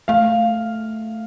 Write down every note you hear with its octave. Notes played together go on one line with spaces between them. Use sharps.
A3 F5